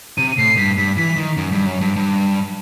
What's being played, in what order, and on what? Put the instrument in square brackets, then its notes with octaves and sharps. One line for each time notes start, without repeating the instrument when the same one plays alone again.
[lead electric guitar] C3 [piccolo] D#7
[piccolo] D#7
[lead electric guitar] A2 [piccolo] C7
[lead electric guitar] G2 [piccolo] B6
[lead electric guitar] G2 [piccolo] B6
[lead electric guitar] E3 [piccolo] B6
[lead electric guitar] D#3
F#2
G2
F#2
G2
G2